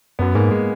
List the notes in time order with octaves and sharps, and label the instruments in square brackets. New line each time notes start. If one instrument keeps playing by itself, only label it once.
[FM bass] F#2 [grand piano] B3
[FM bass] G#2 [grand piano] A#3
[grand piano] G#3